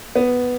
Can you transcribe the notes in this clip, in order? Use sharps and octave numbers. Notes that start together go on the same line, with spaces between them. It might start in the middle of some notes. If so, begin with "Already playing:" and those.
B3